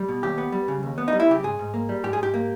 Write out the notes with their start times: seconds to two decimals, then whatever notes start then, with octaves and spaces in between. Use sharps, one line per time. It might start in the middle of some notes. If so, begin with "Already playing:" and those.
Already playing: G3
0.08 B2
0.23 D#2 G4
0.38 B3
0.52 G3
0.68 C#3
0.83 D#2
0.98 B3
1.08 D#4
1.13 G3
1.20 E4
1.28 C#3 G4
1.43 G#2 G#4
1.59 G#2
1.74 A#3
1.89 G3
2.04 G#2 G4
2.13 G#4
2.19 G#2 G4
2.34 A#3